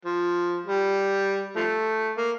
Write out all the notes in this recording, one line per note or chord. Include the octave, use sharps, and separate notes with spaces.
F3
G3
F3 A3
A#3